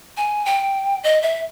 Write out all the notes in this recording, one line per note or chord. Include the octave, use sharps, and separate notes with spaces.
G#5
G5
D#5
E5